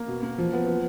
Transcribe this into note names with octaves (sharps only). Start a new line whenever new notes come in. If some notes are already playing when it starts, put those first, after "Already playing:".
Already playing: A#3
B2
A#3
F3
B3
F3